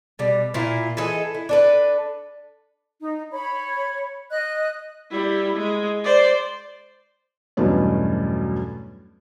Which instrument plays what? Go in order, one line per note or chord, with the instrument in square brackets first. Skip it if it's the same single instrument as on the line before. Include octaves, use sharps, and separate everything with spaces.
[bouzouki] B2 G3
A#2 E4 F4
E3 G#4 A4 D#5
E4
D4 A4 B4
[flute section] D#4
C#5 B5
D#5 F#6
[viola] G3 E4
G#3
C5 D5
[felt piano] E2 G2 B2 F#3 A3 C#4